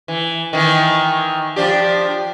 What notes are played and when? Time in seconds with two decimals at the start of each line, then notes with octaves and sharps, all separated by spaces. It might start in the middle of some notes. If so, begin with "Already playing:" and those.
0.08 E3
0.53 D#3 E3
1.56 F3 D4 G4